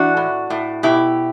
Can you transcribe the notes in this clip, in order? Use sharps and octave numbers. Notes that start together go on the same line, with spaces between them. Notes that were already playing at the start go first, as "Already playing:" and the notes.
Already playing: E3 D4 F#4
A2
A2
B2 E4 G4